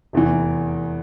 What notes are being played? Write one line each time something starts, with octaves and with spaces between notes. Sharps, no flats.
F1 E2 E3